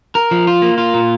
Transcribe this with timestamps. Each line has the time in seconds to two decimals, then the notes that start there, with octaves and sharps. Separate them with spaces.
0.15 A#4
0.31 F3
0.47 F4
0.62 A#3
0.78 F4
0.94 A#2